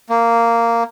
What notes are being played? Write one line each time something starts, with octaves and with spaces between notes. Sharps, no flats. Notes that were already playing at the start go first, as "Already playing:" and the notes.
A#3